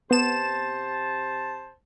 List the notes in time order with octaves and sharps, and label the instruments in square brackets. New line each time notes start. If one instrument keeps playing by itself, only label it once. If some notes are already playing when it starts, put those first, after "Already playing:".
[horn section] C3 C5 A5 [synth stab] B3 E7